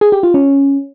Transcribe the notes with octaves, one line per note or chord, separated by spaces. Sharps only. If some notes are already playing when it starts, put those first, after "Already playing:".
G#4
G4
F4
C#4